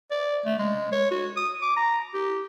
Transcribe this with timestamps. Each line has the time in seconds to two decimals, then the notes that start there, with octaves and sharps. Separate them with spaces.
0.11 D5
0.45 A3
0.58 G#3
0.92 C#5
1.11 F#4
1.36 D#6
1.62 D6
1.77 A#5
2.14 G4